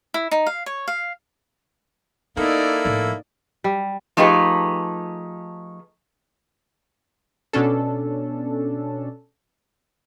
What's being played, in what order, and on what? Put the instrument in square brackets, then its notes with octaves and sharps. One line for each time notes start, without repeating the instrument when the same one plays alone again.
[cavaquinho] E4
D#4
F5
C#5
F5
[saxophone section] A#3 E4 A4 [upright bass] B3 [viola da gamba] D#4 D5
[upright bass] A2 F3
[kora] G3
[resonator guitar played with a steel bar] F3 A3 D#4 G4 G#4 B4
[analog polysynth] B2 C#4 D4 A4